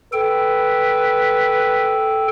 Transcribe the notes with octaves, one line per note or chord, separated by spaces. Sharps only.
A4 B4 G5